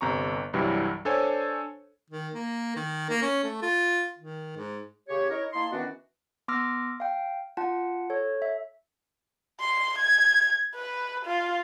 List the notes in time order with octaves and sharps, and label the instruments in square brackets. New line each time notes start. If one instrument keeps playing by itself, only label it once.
[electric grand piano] G1 C3 A#5 C#6
C2 G2 C3 E3 F#3 G3
D4 A4 C5 C#5 G#5
[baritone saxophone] D#3
A#3
D#3
A#3
C#4
A3
F4
D#3
G#2
[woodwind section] C#3 G4 C#5
D#4 E4 A#4 C#5
A#3 D#4 E4 A5 C6
D#3 E3 B3 C#4 D4 F#4
[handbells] B3 C6 D6 E6 F6 A#6
F5 G5
F4 F#5 A5
A4 C#5
E5
[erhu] C6
G#6
B4
F4